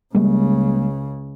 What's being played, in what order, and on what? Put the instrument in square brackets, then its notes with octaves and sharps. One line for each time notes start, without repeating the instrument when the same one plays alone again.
[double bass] C#2 C#3 [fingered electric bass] G3 G#3 A#3